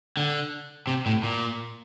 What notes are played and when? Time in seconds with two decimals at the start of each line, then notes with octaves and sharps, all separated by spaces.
0.17 D3
0.87 C3
1.06 A2
1.23 A#2